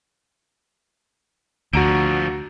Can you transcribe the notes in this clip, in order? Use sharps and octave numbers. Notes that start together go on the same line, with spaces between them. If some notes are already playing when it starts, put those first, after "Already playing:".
D2 D3 F3 F#4 A#5 D7